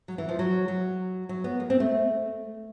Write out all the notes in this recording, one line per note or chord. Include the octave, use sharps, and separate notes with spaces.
F#3
E3
F3
F#3
F#3
F#3
B3
A#3
C4
A3